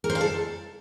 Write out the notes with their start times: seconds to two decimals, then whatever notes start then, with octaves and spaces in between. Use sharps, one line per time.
0.04 A#4
0.10 C5
0.15 F5
0.21 A4